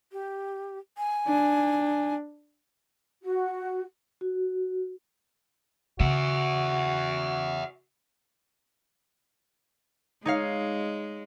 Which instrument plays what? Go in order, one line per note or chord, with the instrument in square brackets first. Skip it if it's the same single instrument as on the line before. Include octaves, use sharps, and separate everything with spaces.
[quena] G4
G#5
[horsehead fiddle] D4
[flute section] F#4
[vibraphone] F#4
[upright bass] C#3 [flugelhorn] F#4 [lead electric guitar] E5 F#5
[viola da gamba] G#3 [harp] D#4 C#5 F5